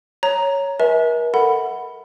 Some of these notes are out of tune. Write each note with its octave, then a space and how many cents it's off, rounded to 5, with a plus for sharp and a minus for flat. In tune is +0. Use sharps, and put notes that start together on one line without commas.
C#5 +0 A#5 +0
A#4 +45 E5 -35 G#5 +35
A4 +30 F#5 +0 B5 +0